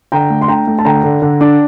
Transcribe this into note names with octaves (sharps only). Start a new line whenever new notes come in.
D3 G5 A#5
A3
C6
D4 G5 A#5
A3
A5
D3 G5 A#5
D3
D3
D4